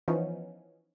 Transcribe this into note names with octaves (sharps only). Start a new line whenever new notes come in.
E3 F3 B3 C#4 D#4